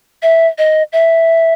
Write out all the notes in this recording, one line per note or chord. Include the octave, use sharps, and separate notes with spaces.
E5
D#5
E5